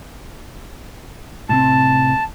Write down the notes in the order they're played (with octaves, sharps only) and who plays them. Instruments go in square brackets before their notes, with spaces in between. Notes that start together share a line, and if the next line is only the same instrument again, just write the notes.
[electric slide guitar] A2 C3 C4 [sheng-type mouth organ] A5